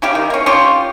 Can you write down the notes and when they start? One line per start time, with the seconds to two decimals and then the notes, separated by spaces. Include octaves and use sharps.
0.02 C#4 E4 G4 F5
0.15 D#3
0.30 A#3 C#4
0.46 C#4 F4 G4